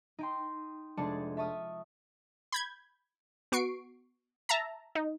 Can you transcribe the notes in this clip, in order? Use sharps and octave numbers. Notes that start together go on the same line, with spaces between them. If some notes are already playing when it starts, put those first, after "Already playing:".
D#4 G5 C6
F1 G#3 D4 G#4 A5 C#7
E5 A5 C#6 D#6 F6
B5 G6 G#6
B3 F#4 C#6 C7 D7
E5 A5 A#5
D#4